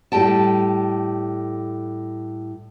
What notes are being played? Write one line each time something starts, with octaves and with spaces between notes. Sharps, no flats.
A2 G3 G4 G5 A5